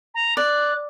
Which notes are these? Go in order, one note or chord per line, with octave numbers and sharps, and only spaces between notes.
A#5
D5 F#6